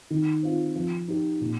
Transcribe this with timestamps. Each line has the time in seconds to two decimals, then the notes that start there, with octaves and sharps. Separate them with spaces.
0.10 D#3
0.43 C4 F4
0.76 F3
1.08 D#4 G4
1.41 A#2